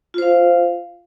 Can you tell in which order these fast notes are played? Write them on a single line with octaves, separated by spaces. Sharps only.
F4 C5 F5